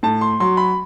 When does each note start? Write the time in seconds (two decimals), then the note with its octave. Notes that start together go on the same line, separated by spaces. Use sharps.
0.03 A2 A5
0.21 C6
0.40 F#3 C6
0.57 B5